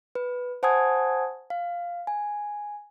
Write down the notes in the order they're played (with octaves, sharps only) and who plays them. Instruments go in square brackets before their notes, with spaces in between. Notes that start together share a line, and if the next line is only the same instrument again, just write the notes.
[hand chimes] B4
C5 F#5 G#5 A5 D#6 G#6
F5
G#5